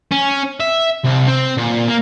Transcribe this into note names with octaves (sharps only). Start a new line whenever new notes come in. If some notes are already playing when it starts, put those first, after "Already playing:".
C#4
E5
C2
C4
A#2
A#3